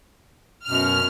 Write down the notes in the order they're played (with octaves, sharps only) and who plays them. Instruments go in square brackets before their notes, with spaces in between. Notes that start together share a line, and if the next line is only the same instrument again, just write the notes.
[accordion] F#2 B2 [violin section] F6